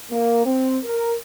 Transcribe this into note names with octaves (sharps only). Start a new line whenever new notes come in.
A#3
C4
A#4